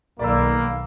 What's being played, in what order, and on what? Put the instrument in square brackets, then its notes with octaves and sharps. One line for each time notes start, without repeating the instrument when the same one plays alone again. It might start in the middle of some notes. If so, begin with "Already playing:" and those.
[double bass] B1 D#3 [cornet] A#3 [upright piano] D5 B5 E6